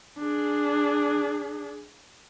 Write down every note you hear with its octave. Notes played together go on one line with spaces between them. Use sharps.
D4 G#4